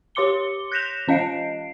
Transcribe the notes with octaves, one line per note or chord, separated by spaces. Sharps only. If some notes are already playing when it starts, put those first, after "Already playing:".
G4 C#5 C6 D6 C#7 G7
F#6 G6 A#6 B6 E7 F7
E3 C#4 D#5 F5 C7 D7